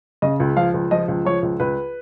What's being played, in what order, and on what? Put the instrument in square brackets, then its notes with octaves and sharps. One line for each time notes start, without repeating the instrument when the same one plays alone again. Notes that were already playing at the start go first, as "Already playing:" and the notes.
[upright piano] C#3 D#5
C#2
F3 F5
C#2
F3 D#5
C#2
F3 C#5
C#2
C#2 B4